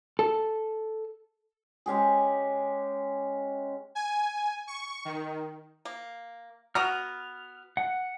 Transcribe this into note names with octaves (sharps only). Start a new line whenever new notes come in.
A4
G#3 C#4 G4 G#4
G#5
C#6
D#3
A#3
B3 F#4 A#5 F6
F#5